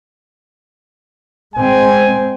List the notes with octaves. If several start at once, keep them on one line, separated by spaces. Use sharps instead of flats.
G#3 C4 G#5